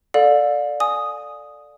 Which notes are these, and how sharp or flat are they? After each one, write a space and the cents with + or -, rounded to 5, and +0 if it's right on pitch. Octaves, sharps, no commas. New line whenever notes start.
A4 +0 D5 +0 F5 +35
G#5 +0 D#6 +0